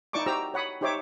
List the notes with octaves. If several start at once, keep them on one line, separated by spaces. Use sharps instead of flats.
D#4 E4 D5 A5 C#6 D6
F#4 G4 C5 A#5 E6
C#5 F#5 B5 D#6
D#4 G4 C5 C#5 E5 D6